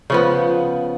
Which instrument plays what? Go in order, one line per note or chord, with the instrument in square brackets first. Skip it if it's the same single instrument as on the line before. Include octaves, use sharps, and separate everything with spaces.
[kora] C#3 F3 B3